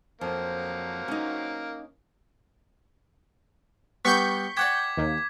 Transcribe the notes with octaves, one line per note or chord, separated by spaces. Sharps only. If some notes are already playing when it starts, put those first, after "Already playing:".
F2 F#3 A#3 C5
C#4 D#4
G3 B3 C#6 G6 B6
D5 F#5 G5 D6 G#6 B6
D#2